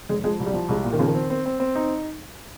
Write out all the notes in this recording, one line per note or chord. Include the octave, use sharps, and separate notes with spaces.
F1 G#3
F3 G#3
C2
G3
F3
C2 G#3
A#2
D#3
C#3 F3
D#3
C4
C4
C4
C4
D#4